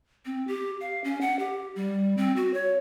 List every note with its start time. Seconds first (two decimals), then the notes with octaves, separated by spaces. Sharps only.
0.26 C4
0.48 G4
0.81 F5
1.04 C#4
1.21 F#5
1.39 G4
1.76 G3
2.17 C4
2.36 F#4
2.54 C#5